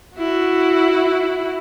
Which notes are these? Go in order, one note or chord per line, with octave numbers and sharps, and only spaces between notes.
E4 F#4